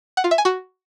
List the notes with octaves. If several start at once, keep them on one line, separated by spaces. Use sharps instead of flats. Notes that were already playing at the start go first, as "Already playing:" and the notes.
F#5
F4
E5
G#5
F#4